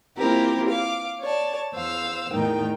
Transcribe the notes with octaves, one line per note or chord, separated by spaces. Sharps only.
A#3 C4 E4 F4 G4 A#4
F5 D6
C#5 D5 A5
E2 C5 F5 E6
E2 A2 D#3 D#4 G5